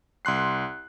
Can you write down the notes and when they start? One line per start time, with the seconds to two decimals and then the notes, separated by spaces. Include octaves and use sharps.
0.25 C2 C6 F#6 C7